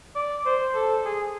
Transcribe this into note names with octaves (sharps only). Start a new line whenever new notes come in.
D5
C5
A4
G#4